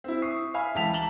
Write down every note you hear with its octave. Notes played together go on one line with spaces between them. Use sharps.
C4 E4
C#6 D#6 C7
E5 F5 G#5 B5
C#2 E3 G5 A5 B6 F7
A5 A#5 F#7 G7